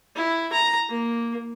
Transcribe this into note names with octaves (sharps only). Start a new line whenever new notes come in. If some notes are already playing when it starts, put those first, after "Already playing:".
E4
A#5
A#3